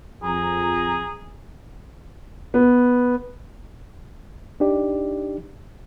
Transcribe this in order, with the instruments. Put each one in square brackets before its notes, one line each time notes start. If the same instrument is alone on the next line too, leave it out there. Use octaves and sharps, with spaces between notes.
[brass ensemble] F2 A#5 [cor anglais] G#4
[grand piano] B3
[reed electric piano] D4 D#4 G4 D5